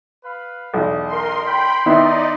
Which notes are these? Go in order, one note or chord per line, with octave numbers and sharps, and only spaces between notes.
B4 F5 B5
B1 E2 D#5
A#4 C6
G5 B5 C6
D#3 B3 D#4 E4 D5 D#5